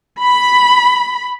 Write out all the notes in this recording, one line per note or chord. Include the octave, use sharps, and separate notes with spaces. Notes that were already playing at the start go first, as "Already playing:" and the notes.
B5